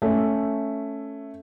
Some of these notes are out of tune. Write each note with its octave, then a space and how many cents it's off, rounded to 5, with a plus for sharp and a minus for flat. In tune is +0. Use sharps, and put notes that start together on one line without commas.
A3 +0 C#4 +0 E5 +0